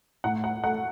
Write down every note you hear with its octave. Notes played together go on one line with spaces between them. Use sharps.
A2 F#5
F#5
A3 F#5